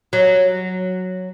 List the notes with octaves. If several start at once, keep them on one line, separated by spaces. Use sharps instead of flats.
F#3